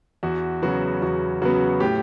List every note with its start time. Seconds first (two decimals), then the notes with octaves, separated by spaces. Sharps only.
0.23 E2 F#4
0.62 C#3 F#3 B3 F#4
1.02 E2 F#4
1.42 C#3 F#3 B3 F#4
1.80 A2 G4